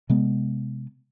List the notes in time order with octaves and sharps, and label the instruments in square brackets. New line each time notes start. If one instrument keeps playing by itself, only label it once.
[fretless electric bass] C3 G#3 B3